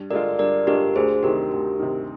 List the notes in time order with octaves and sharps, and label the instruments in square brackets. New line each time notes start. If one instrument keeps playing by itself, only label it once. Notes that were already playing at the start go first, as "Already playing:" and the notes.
Already playing: [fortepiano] G2
[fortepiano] D3 G#3 D4 F4 [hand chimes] A#4 D5
[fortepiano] G2 [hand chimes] A#4 D5
[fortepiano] D3 G#3 D4 F4 [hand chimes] G4 A#4
[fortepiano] D2 [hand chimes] G#4 C5
[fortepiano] C3 D#3 [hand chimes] G4 A#4
[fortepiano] D2
C3 D#3